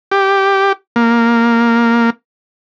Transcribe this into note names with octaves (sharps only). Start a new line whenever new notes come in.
G4
A#3